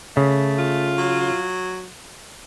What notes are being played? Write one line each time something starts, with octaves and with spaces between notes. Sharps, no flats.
C#3 A3
F4
F#3